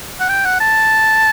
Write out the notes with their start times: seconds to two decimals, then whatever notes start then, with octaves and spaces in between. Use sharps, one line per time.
0.20 F#5
0.29 G5
0.45 F#5
0.60 A5